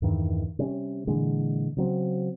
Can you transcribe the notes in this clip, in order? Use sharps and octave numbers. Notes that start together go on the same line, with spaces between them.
E2 G2 D#3 E3
C3 G3 C#4
A#2 D3 E3 G#3
C#3 F#3 C4